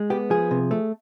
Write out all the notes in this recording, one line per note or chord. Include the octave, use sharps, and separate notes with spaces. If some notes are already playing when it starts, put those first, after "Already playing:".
Already playing: G#3
B3 G4
F3 G#4
C3
A3